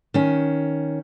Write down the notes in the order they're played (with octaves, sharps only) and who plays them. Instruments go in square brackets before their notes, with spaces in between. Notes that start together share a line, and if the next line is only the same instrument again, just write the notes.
[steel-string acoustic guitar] D#3 C#4